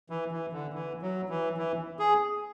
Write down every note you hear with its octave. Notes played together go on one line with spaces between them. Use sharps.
E3
E3
D3
E3
F#3
E3
E3
G#4